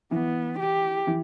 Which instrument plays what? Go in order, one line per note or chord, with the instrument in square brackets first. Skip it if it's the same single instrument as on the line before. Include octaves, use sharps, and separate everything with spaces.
[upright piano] E3 [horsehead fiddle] B3
[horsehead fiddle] G4
[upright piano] E3